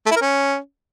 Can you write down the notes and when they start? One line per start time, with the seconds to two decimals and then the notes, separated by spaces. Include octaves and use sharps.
0.06 A3
0.11 E4
0.16 A#4
0.21 C#4